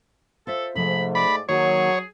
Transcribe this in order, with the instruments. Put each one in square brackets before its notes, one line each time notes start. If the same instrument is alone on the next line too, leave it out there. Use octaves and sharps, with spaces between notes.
[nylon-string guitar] F4 C5 E5 [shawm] A4
[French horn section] G#2 A3 [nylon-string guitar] C3 F3 [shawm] B5
[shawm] D5 [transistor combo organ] B5
[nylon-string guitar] D#3 A#3 [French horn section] F#3 [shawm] G#4 [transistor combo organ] C#5